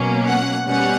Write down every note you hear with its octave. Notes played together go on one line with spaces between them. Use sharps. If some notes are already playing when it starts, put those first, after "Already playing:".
Already playing: B2 F#3 A#3 C#4
F#5
B2 G3 C#4 F#5